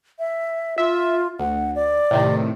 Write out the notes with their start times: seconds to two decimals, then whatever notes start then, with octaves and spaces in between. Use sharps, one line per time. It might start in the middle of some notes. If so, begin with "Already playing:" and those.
0.19 E5
0.78 F4 E5
1.39 D2 F#5
1.76 D5
2.11 A2 C3 D#3